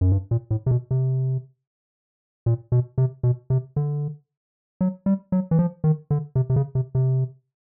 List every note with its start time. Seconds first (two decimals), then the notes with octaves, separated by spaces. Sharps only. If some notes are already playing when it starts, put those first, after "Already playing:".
0.01 F#2
0.12 G2
0.31 A#2
0.50 A2
0.66 C3
0.71 B2
0.91 C3
2.46 A#2
2.72 B2
2.98 C3
3.23 B2
3.50 C3
3.76 D3
4.81 F#3
5.06 G3
5.32 F#3
5.51 E3
5.59 F3
5.84 D#3
6.11 D3
6.35 C3
6.50 C3
6.56 C#3
6.75 C3
6.95 C3